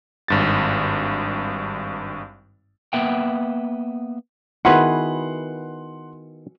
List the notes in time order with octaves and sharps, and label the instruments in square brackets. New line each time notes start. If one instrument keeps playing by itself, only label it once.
[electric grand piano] G#1 G2 A6
[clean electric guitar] A#3 B3 B4 E5 F#5 G5
[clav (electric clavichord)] D#3 B3 E4 [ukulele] F#4 G#4 B4 [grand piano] F#5 C6